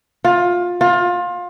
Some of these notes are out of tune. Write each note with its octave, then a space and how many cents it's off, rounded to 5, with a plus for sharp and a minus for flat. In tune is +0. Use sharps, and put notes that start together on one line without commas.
F4 +20
F4 +25